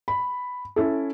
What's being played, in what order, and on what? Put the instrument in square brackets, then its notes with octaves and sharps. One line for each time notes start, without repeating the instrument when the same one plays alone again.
[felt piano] B5
C#4 E4 A4